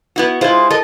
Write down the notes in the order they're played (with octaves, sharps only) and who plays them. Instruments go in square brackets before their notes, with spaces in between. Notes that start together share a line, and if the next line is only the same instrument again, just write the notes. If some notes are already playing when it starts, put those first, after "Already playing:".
[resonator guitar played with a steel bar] B3 E4 F#4
[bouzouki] G#3 C5 [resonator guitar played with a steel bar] E4 F4
[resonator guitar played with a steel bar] A4 A#4 D#5